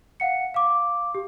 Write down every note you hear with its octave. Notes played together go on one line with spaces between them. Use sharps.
F5 F#5 C#7
F5 D6
G4